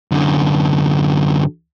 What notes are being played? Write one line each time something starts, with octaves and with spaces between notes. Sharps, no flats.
F#2 D3